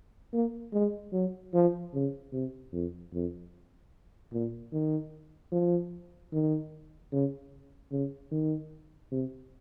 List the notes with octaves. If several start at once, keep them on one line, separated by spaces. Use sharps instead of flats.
A#3
G#3
F#3
F3
C#3
C3
F2
F2
A#2
D#3
F3
D#3
C#3
C#3
D#3
C3